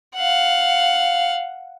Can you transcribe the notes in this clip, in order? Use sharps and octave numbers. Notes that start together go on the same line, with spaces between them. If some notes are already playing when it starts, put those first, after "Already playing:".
F5 F#5